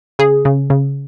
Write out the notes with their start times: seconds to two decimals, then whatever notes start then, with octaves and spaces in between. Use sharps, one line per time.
0.19 C#3 G#4
0.45 C#3
0.70 C#3